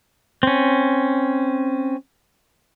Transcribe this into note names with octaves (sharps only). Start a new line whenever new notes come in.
C4 C#4